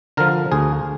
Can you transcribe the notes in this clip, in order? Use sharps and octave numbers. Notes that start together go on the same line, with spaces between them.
D3 F3 A#4
D2 G#4